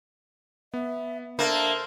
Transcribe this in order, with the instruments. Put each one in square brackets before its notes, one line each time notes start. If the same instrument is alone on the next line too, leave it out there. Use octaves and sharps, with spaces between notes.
[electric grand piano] B3 [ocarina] E5
[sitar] A#3 [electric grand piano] D4 A5 A#6 [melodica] A4 C5 F5 [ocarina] E5